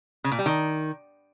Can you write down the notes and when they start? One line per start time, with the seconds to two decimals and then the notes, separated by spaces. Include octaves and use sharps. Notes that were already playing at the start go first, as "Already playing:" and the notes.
0.24 C#3
0.32 A#2
0.39 G3
0.46 D#3